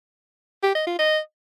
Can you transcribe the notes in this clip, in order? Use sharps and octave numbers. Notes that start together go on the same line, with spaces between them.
G4
D#5
F4
D#5